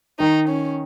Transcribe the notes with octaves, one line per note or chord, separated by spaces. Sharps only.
D#3 D#4
C#4